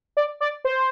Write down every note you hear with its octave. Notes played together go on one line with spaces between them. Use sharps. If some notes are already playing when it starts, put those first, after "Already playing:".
D5
D5
C5